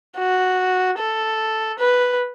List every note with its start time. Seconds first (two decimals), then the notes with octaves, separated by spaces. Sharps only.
0.18 F#4
0.98 A4
1.79 B4